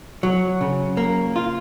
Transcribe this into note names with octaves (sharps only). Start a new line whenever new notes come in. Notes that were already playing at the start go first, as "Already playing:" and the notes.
F#3
C#3
A#3
F4